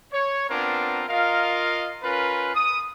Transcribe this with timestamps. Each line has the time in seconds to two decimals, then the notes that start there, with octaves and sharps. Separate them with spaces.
0.13 C#5
0.49 B3 C4 D4 F4 A#4
1.08 F4 A#4 D#5 F5
2.03 C#4 F4 A#4 B4
2.55 D#6